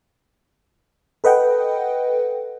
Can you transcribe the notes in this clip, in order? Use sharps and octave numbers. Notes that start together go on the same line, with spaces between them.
A4 B4 D#5 F#5 G5